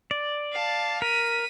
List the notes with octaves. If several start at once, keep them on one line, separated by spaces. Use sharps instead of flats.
D5
F5 A5
A#4 B6 D#7